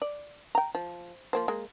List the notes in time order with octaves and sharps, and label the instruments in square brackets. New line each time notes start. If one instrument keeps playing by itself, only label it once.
[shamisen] D5
G5 A#5
F3
F3 A#3 C5
G#3 A#3